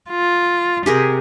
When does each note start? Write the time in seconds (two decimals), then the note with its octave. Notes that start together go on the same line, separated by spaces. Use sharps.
0.10 F4
0.86 C3 G4 G#4 A#4